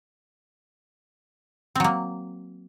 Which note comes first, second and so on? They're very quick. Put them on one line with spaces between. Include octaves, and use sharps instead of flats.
C4 F#3 A#3